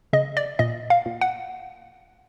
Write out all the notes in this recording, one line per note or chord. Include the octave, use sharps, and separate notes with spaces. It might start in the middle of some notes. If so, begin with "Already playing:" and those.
C#3 D#5
D5
A#2 D#5
F5
A#2
F#5